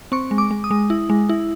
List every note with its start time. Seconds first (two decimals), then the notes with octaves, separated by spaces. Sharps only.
0.12 C4 C#6
0.31 G#3
0.38 D6
0.51 G#3
0.64 D#6
0.71 G#3
0.90 E4
1.10 G#3
1.29 E4